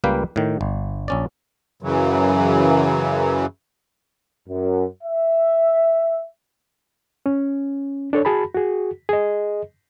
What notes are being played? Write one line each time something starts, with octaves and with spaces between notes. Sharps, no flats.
C#2 G3 A#3 B4 F5 G5
A2 D#3
G1
A#1 C#4 D5
F#2 C#3 E3 F#3
F#2
E5
C#4
D4 A4 C#5
F#4 G#4 A5 B5
F#4 G#4
G#4 D#5